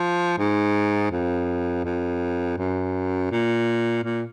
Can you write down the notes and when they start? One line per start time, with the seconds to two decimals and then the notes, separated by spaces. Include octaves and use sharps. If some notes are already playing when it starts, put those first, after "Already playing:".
Already playing: F3
0.38 G#2
1.11 F2
1.85 F2
2.58 F#2
3.31 A#2
4.04 A#2